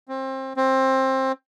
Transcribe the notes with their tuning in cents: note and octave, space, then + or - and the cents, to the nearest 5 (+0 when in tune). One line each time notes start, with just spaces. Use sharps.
C4 +25
C4 +20